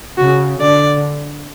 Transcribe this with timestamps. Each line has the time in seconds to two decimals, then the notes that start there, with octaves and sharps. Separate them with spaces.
0.18 C#3 F#4
0.60 D3 D5